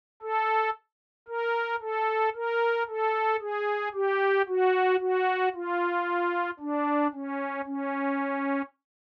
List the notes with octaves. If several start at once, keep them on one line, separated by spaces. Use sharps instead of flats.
A4
A#4
A4
A#4
A4
G#4
G4
F#4
F#4
F4
D4
C#4
C#4